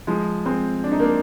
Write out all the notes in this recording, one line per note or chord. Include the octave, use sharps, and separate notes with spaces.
F3 G#3
G#3 C4
D4
D#4
A#3 D4